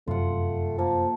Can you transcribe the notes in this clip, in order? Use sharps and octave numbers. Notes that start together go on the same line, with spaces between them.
F1 F#2 C3 A3 F4 F#5
F3 A#3 A4